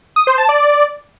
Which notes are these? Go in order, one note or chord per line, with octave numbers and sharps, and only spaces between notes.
D#6
C5
A5
D5